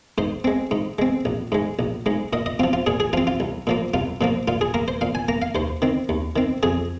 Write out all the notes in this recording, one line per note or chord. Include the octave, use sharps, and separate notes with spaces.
G#2 C5
G#3 C4
G#2
G#3 C4
A#1
G#2 G#3
A#1
G#2 G#3
A#2 D#5
D#5
F3 C4 F4
F4
A#2 G#4
G#4
F3 C4 F4
F4
C2
A#2 F3 A#3
C2 F4
A#2 F3 A#3
A#2 F4
G#4
A#3 A#4
C5
A#2 F5
G#5
A#3 A#5
F5
D#2 C5
D#3 C4
D#2
D#3 C4
F2 G#4